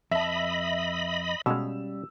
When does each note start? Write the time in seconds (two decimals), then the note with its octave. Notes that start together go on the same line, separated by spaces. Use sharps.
0.11 F2 D#5 E5 A5 B5
1.46 B2 G3 G#3 C#4 F5 E6